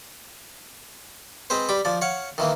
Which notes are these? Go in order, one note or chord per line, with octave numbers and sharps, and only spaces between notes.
G#3 C4 B4 C5
G3 B5 D6
F3 D5
C#5 F5 F#5
D#3 E3 A#3